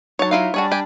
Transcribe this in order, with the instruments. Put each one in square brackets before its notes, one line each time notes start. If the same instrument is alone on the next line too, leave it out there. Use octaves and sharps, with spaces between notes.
[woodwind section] F#3 D#4 [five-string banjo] C#5 A5
[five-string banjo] E4 F4 F5
[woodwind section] G3 D4 [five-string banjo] F#4 G#4 C#5
[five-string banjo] G4 G#5